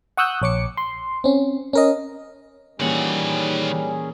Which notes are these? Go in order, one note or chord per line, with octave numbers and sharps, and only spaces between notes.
F#5 C#6 D#6 E6 F#6 G6
A#1 C#5 D6 C#7
C6
C4 C#4
C#4 A#4 D#5
A#2 D#3 E3 G3 C#4 G#4 F#5